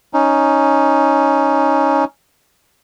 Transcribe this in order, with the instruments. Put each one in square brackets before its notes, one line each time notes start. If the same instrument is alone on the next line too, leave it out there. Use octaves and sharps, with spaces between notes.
[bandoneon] C#4 D#4